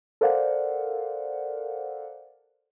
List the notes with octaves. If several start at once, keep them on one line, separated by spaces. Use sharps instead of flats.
A4 A#4 C5 D5 F5 F#5